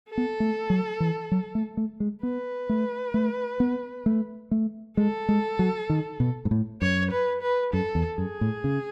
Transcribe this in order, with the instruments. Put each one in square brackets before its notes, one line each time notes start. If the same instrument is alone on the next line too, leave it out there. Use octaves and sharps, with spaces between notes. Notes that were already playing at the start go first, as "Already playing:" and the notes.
[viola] A4
[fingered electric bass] B3
A3
F#3
E3
F#3
A3
A3
G#3
[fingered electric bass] B3 [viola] B4
[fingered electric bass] A3
A3
B3
A3
A3
[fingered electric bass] G#3 [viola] A4
[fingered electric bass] G#3
F#3
D#3
B2
G#2
A2
[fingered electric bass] F#2 [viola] C#5
[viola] B4
B4
[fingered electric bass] F#2 [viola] A4
[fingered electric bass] E2
[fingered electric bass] F#2 [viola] G#4
[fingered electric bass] A2
C#3